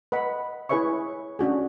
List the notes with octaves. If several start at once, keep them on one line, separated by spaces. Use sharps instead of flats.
B4 D#5 F#5 B5
E4 G#4 B4 C#5 E5 C#6
C#4 D4 F#4 G#4